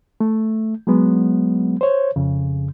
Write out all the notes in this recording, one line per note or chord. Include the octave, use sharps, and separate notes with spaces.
A3
F#3 G#3 B3
C5 C#5
F2 C#3